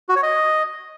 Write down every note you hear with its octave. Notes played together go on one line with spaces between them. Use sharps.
F#4
C#5
D#5